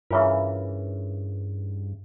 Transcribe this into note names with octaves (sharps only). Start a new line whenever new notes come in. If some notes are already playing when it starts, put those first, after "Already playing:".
G2 C#3 E3 F4 A#4 C#5 E5